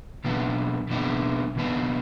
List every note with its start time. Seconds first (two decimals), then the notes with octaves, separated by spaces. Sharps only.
0.24 B2 F#3 B3 D4
0.90 B2 F#3 B3 D4
1.56 B2 F#3 B3 D4